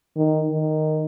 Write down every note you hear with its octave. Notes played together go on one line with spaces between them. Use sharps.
D#3
D#3